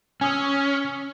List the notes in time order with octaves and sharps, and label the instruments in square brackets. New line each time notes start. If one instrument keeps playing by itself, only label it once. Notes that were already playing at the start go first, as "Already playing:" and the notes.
[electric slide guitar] C#4 [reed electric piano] G#5 D#6 E6